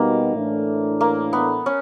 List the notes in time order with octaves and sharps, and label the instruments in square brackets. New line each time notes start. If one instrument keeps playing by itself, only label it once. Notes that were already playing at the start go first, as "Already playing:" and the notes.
Already playing: [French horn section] B2 G3 B3 D#4 F#4 [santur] A#3
[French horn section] A2 E3 A3 D4
[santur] A#3
B3
C#4